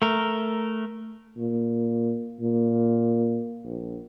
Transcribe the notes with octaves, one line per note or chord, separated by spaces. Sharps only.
A3 A#4
A#2
A#2
A#1